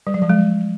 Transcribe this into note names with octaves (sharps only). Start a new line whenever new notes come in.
G3
F#3
F3
G#3